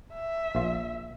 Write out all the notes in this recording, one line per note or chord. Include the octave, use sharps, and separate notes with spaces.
E5
A#1 F4